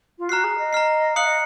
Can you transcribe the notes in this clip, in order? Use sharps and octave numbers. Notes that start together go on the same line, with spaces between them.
F4
F#4 A#5 F6 C7
G#4
D#5
A#5 F6 C7
F5 D#6 F#6 C#7 F#7
D#5